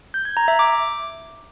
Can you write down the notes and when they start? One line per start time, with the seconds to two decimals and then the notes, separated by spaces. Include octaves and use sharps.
0.14 G6
0.25 G#6
0.37 A#5
0.48 E5
0.59 D6